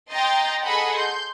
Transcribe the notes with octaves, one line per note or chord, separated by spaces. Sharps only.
D#5 G5 A#5 C6 G6 A6
G#4 A4 D#5 F#5 B5
C6 G6